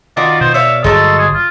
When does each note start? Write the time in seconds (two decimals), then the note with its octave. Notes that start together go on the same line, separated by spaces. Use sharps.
0.17 D#3 F4 F#4 D5
0.41 B2 C5
0.54 C#5 D5 E5 F5
0.84 G1 F#3 G#3 A4
1.19 G#4
1.34 F4